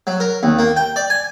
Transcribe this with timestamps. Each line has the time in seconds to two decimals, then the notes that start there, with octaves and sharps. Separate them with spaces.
0.07 F#3
0.20 A#4
0.43 D#2
0.59 A#3
0.76 G5
0.96 D5
1.10 G#5